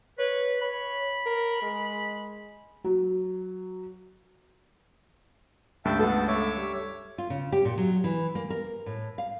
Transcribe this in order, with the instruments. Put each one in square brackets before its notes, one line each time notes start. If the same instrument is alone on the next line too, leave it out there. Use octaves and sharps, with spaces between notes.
[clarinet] B4 [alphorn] C#5
[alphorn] C#5 [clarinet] B5
[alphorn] A#4
G#3
[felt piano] F#3
[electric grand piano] C#2 G2 A3 [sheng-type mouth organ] E5 G5 A5
[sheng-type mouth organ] B3 A5 [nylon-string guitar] A4
[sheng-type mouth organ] C#5 E5 D6
[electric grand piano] G3
[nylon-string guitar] F4
C#3
G4
A#2
F#3
E3
A#3
A#4
A2
F5